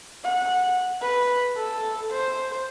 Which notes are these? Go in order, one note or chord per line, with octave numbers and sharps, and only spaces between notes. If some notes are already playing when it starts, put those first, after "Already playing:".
F#5
B4
A4
C5